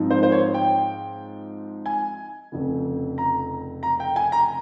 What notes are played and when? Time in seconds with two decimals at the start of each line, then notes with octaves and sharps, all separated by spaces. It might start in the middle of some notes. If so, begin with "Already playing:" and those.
Already playing: G#2 F3 C4 D#4
0.11 C5
0.23 C5
0.32 C#5
0.54 G5
1.86 G#5
2.52 F1 F2 C#3
3.18 A#5
3.83 A#5
4.00 G5
4.16 G#5
4.32 A#5